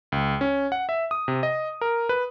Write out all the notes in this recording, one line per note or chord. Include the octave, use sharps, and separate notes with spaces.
C#2
C#4
F#5
E5
D#6
C3
D#5
A#4
B4